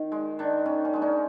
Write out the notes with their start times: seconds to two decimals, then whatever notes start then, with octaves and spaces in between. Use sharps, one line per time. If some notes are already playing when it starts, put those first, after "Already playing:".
Already playing: D#3
0.12 G#3
0.39 D#3 D4
0.66 D#3 C#4
0.85 C#4
0.93 G#3 D4
1.02 C#4 D#4